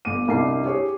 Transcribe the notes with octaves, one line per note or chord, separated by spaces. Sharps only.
G1 D6 D#7
C2 D4 D#4 D6 C7
G4 G#4 C#5